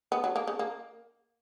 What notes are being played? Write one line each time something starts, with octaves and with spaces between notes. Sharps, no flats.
B3
F#3
A#3
C#3
A#3